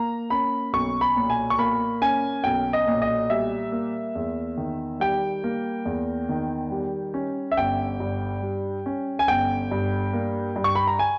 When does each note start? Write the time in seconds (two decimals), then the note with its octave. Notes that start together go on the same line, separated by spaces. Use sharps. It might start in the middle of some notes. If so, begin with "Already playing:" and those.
Already playing: A#3 A#5
0.30 C#4 B5
0.73 B1 C#6
1.01 B5
1.17 A#2
1.30 G#5
1.50 C#6
1.59 A#3 B5
2.02 C#4 G#5
2.44 B1 G5
2.73 D#5
2.87 A#2
3.02 D#5
3.30 G3 E5
3.72 A#3
4.15 E2
4.57 D#3
5.00 G3 G5
5.44 A#3
5.86 E2
6.29 D#3
6.71 G3
7.14 C#4
7.52 E5
7.57 G1 G5
8.00 G2
8.42 G3
8.86 C#4
9.19 G#5
9.28 G1 G5
9.71 G2
10.13 A#3
10.56 G2
10.64 C#6
10.75 B5
10.87 A#5
10.99 G#5